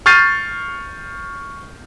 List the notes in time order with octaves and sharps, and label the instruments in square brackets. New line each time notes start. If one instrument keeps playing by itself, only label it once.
[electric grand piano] C#6 F6 G6 A6 C7 D#7